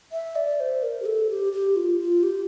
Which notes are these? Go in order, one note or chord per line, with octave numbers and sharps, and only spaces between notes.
E5
D5
C5
A#4
G4
A4
G4
G4
F4
F4
G4